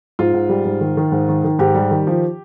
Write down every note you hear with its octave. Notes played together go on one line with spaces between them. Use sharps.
G#2 F4
G#2
G3
G#2
D#3
D#3
G#2
D#3
D#3
G#2 G4
G3
D#3
F3